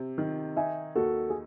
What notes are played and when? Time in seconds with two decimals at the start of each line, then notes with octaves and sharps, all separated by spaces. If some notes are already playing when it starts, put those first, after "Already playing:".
Already playing: C3
0.18 D#3
0.56 D#4 E5 G#5
0.95 D#2 F#4 A4
1.30 G#4